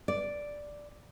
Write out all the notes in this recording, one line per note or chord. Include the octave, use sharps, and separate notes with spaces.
D5